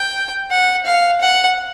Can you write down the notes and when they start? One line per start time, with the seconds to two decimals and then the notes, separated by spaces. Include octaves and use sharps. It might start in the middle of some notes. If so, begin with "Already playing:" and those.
Already playing: G5
0.51 F#5
0.86 F5
1.21 F#5